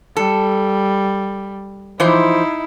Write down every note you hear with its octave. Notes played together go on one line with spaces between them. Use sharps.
G3 A4
E3 F3 D#4 E4 C5